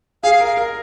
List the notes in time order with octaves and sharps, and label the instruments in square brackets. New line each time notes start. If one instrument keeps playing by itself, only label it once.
[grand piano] G#4 [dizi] F5
[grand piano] A#4
[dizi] F5
[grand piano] A#4